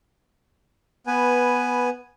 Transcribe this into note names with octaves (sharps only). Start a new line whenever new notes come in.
B3 B4 G#5